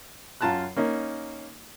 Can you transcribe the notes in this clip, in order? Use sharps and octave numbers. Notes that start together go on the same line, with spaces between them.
F#2 F4 A5 A#5 F#6
A#3 C#4 D#4